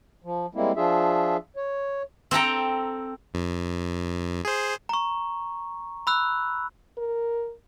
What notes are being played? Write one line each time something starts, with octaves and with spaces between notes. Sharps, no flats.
F3
G3 G#3 A#3 C4 E4
F3 D4 F4 G#4 E5
C#5
C4 A4 G5 A#5
F2
G#4 C5
A#5 C#6
B5 E6 F#6
A#4